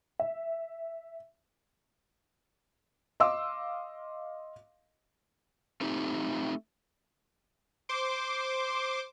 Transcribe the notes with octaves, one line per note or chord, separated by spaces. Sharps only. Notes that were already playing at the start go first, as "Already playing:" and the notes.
E5
D#5 F5 C6 D6 E6
A3 C4 D#4 G4
C5 C6 D6